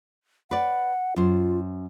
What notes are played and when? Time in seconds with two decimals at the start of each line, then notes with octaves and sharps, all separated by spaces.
0.51 B4 D5 F#5
1.16 F#2 F4 C5